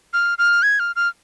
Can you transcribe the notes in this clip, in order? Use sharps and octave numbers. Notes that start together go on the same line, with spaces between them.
F6
F6
G#6
F6
F6